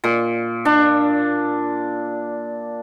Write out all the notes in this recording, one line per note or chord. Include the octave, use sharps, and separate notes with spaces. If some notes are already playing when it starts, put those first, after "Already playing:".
A#2
D4